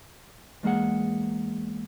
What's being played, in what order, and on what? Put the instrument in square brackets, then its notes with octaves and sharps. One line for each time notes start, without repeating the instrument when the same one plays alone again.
[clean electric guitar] E2 G#3 A#3 G#4 F#5